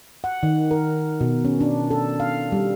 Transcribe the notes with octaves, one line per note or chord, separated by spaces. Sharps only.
F#5
D#3
A#4
B2
C#4
D4
A4
F5
G3